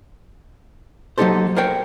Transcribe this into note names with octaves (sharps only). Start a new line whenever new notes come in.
F#3 A#3 D#4 G4 A4 C5
A#4 C5 C#5 G5